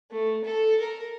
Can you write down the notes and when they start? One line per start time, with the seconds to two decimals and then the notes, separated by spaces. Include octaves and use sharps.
0.11 A3
0.44 A4
0.80 A#4